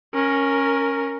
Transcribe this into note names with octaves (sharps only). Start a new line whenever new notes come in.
C#4 A#4